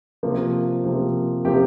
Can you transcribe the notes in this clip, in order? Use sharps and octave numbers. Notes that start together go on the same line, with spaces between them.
C3 F3 A#3
C3 F3 A#3
C3 F3 A#3 G4